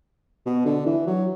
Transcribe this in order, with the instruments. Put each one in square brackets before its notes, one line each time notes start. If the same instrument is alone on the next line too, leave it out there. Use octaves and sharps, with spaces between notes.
[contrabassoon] B2
D3
E3
F#3